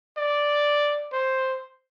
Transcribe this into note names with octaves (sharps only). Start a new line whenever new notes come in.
D5
C5